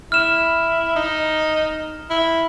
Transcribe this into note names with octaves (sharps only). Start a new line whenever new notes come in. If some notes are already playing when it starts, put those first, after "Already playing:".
E4 F6 E7
D#4
E4